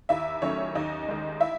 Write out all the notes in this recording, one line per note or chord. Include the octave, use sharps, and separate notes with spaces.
D#2 E4 E5
D#3 F#3 A3 C#4 C#5
D#2 D#4 D#5
D#3 G#3
E4 E5